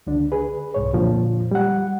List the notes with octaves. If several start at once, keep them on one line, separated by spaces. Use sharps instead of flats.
C#2 D3 D4
G#4 B4
C2 G#2 C#5
F2 A#2 D3 F3 F4
G3 F#5